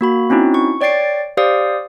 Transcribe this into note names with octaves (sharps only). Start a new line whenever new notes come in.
A#3 F#4 B5
C4 C#4 D#4 E4 F#4
C#6
C#5 D5 G5 A6 C7 D7
G4 C5 D5 F5 D#6